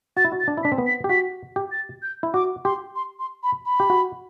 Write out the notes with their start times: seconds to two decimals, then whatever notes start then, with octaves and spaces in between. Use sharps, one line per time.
0.17 F#4 A6
0.25 E4
0.32 F#4
0.40 A6
0.48 D4
0.57 E4
0.63 D4 B6
0.72 C4
0.78 B3
0.86 B6
1.04 G4
1.09 F#4 B6
1.56 G4
1.72 A6
2.02 G6
2.23 E4
2.34 F#4 D6
2.65 G4 C6
2.96 C6
3.19 C6
3.43 B5
3.65 B5
3.80 G4
3.90 F#4